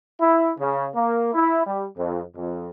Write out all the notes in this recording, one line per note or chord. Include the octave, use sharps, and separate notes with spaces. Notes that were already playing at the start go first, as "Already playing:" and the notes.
E4
C#3
A#3
E4
G3
F2
F2